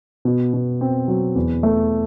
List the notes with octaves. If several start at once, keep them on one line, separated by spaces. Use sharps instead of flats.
B2
B2
C4
F#3
E2
A3